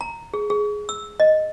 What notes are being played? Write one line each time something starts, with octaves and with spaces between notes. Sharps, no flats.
A#5
G#4
G#4
E6
D#5